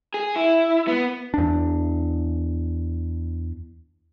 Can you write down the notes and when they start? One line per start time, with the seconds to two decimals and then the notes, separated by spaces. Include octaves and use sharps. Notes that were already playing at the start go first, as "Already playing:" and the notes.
0.14 G#4
0.36 E4
0.88 B3
1.34 E2 D4